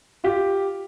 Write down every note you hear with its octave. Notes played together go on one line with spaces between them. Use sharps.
F4 G4